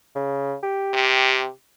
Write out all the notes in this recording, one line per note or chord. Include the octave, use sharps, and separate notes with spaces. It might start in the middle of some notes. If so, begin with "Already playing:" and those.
C#3
G4
C3